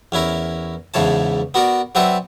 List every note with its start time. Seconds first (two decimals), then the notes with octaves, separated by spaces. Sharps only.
0.12 E2 C#4 E4 A#4
0.94 E2 G#2 C#3 E3 C#5 A5
1.54 B3 F#4 A#4 D5
1.95 F#3 C4 F#4 B4 D5 E5